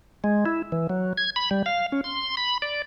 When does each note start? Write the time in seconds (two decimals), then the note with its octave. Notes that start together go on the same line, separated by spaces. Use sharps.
0.24 G#3
0.46 E4
0.72 E3
0.89 F#3
1.18 G#6
1.36 B5
1.51 G3
1.66 F5
1.92 C#4
2.04 C6
2.37 B5
2.62 D5